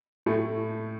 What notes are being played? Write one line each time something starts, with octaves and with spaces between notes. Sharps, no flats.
A2 A3